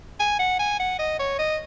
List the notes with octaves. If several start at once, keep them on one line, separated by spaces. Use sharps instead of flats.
G#5
F#5
G#5
F#5
D#5
C#5
D#5